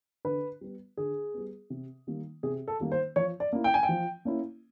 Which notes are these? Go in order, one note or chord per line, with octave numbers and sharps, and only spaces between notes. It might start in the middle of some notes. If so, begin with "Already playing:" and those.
D3 B4
G3 B3
D3 G#4
G3 B3
C3
D#3 G3 A#3
C3 G#4
A4
D#3 G3 A#3
C5
F3 C#5
D5
A#3 C#4 E4
G5
G#5
G5
F3
A#3 C#4 E4